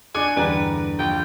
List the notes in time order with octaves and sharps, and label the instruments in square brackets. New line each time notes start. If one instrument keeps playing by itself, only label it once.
[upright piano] D4 G#4 [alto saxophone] G#5 [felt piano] D6 F#6 C#7
[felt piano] E2 G2 D3 [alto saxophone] B4 [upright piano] D5 G5 A#5
[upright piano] A#1 [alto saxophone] G5